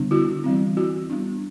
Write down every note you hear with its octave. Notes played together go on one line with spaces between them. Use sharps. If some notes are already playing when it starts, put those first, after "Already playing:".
Already playing: D3 G3 B3 D4
E4 F#4
E3 G3 C4
E4 F#4
G3 B3 D4